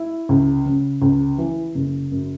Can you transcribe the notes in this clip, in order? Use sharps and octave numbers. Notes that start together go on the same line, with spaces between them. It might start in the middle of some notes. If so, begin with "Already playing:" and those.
Already playing: E4
C#2
C#3
C#2
E3
F#1
F#2